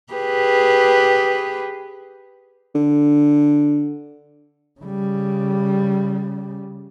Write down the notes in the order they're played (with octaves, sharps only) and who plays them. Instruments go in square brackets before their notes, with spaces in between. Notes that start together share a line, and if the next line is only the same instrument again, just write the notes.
[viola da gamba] G4 G#4 B4
[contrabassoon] D3
[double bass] C#3 G3